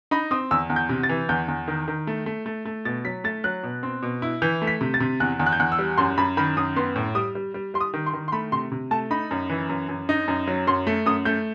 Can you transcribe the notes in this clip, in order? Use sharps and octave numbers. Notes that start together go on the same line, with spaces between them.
D#4 B5
C4 D#6
E2 E6
E2
G6
C3
A6
E3
E2 G6
E2
D#3
D#3
A3
A3
A3
A3
B2 A6
F#3 B6
A3 A6
F#3 F#6
B2
C4
B2
E4
E3 G6
A3
B6
C3
A6
C3
E2 F#6
E2
F#6
G6
E2 F#6
E6
G3
F#2 C6
F#2 B5
D#3 B5
F#2 D#6
B3 C6
A2
G3 D#6
G3
G3
G3 C6
D#6
D#3
C6
D#3
C6
A3 B5
C3 C6
C3
A3 A5
D#4 B5
F#2
E3
F#2
F#2
D#4
F#2
F#3
F#2 C6
A3
F#2 D#6
A3 G6